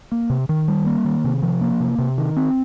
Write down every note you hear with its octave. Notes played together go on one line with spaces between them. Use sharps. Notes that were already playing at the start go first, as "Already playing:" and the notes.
A#3
C3
D#3
G3
A#3
D#3
C3
F3
A#3
C3
C3
D#3
C4